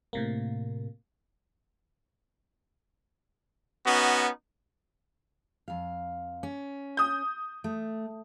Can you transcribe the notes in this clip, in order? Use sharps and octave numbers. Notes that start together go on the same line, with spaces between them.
A2 C3 A#3
B3 C#4 D#4 F#4
F2 F5
C#4
D#6 G6
A3